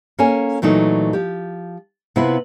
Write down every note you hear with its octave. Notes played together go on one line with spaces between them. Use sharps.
A#3 C#4 A4 C#5 G#5
A#2 E3 F#3 A3 D#4
F3 G4
C3 B3 E4 F4 B4